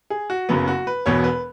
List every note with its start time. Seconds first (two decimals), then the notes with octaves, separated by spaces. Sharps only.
0.10 G#4
0.30 F#4
0.49 F#1 F#2 C#3 F#3 B3
0.68 F#4
0.87 B4
1.06 E1 E2 B2 B3 C#5
1.24 B4